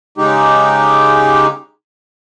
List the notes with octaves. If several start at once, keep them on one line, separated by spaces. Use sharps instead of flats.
C#3 G#3 D#4 G4